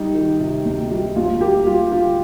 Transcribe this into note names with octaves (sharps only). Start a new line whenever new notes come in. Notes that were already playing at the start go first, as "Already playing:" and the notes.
Already playing: G3 D#4
D#3
C3
D2
G3
D2 F4
A#3 G4
G3 F4
D3 F4